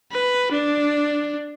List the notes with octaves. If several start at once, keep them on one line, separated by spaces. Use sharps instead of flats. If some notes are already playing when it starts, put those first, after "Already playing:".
B4
D4